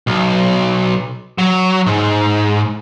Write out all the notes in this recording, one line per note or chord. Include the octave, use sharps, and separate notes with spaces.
B1
F#3
G#2